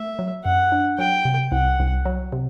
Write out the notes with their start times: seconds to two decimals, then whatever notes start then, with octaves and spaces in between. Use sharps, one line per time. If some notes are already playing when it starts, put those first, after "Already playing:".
Already playing: A3 E5
0.19 F#3
0.44 F#2 F#5
0.72 D4
0.98 F#3 G5
1.25 C3
1.52 C2 F#5
1.80 C2
2.06 F#3
2.32 C3